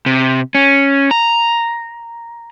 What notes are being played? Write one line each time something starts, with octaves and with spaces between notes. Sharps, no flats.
C3
C#4
A#5